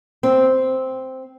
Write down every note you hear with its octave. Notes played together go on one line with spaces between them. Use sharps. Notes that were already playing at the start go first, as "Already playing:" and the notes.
C4